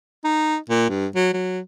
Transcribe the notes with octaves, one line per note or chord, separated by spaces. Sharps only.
D#4
A#2
G2
F#3
F#3